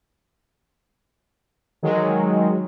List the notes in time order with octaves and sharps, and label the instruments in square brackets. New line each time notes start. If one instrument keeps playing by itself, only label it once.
[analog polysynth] D#3 F#3 G#3